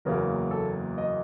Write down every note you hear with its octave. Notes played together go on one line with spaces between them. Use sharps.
F#1 E2 C#3 F#3 A#3 A#4
A4
D#5